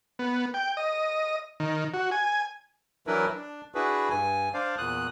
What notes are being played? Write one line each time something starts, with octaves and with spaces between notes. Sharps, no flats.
B3
G5
D#5
D#3
F#4
G#5
E3 F#3 D4 E4 A#4 B4
D4
D4 E4 F#4 G#4 B4
G2 G#5
D4 C5 D5 F5
E2 A#2 D#6 F#6